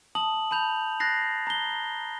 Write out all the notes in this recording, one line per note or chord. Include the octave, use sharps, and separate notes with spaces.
A5 D#6 F#7
A5 B5 G6 F7
F#6 A6 A#6 C7
A#5 G7